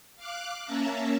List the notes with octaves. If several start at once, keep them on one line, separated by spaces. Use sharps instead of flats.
F5 D6 F#6
A#3 C#4 E5 A5 A#5